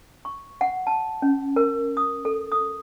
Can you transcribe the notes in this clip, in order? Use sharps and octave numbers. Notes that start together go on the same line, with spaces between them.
C#6
F#5
A5
C#4
A#4
D#6
A4
D#6